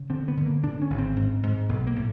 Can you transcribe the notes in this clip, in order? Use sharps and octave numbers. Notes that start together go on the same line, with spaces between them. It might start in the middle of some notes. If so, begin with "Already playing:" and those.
Already playing: C#3
D3 C4
B3
D3
A#3
D3 D4
C#4
G#1
C4
G#2
G#2
B1 B3
A#3
A2